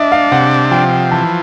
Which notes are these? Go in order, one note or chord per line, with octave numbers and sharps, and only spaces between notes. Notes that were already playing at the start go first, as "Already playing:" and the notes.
Already playing: D4 D#5 E5
F5
C3 F#5
F3 G5
E3 A5